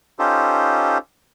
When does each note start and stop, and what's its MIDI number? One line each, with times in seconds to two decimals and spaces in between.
0.19 0.98 61
0.19 0.98 63
0.19 0.98 65
0.19 0.98 67
0.19 0.98 69
0.19 0.98 72